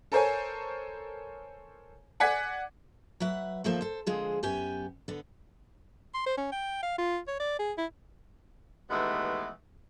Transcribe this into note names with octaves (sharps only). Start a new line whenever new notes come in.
A4 A#4 C5 C#5 G#5
D5 F#5 G#5 G#6 B6
F#3 B4 E5 F#5
D#2 F3 A3 A#3 C5 E5
A4 C5
D3 F3 G#3 C4 G#4 C5
F#2 B3 G4 G5 G#5
D3 B3
C6
C5
C#4
G5
F5
F4
C#5
D5
G#4
E4
D#2 E3 G#3 A3 B3